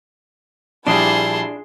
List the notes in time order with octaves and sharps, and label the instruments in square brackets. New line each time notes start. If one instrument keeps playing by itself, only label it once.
[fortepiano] A#1 G3 [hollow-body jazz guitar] D4 [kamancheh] E4 A5 [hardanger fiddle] G#4 C6